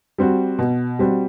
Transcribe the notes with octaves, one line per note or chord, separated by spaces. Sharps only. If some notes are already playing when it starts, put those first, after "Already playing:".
G3 C4 F#4
B2
G3 C4 F#4